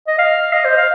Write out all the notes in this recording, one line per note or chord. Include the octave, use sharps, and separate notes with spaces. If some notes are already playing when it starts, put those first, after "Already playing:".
D#5
F5
D#5
C5
F5